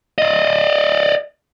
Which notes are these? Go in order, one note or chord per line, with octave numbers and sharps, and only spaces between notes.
D5 D#5